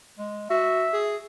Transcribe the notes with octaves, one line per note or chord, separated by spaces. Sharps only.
G#3
F#4 E5
G#4